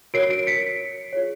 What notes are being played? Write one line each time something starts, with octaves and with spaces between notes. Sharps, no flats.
F#4 A#4 C#5 C7 D7
C7 D7
B6 C#7
F4 G#4 C#5